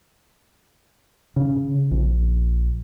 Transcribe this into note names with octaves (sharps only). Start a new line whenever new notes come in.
C#3
A#1